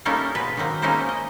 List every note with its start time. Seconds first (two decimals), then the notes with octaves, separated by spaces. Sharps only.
0.05 G3 A3 A#3 C#4 D#4 E4
0.35 B2 G#3 B4
0.57 D#3 F#3 A#3 C4
0.82 G#3 A#3 C#4 D#4 E4 C5
1.09 D#5